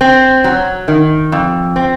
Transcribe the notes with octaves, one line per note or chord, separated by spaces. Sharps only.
C4
F#3
D#3
F2
C4